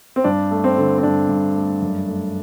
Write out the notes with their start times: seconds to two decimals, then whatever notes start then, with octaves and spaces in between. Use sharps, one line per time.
0.16 C4
0.24 G2 D4
0.51 A3
0.64 C4
0.78 D3
0.98 C4
1.03 G2 D4
1.29 G2
1.56 A3
1.82 F#2
2.08 A3